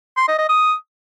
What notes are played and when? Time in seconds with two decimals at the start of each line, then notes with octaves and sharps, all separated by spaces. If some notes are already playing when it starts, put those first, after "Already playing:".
0.17 C6
0.28 D#5
0.38 D#5
0.49 D#6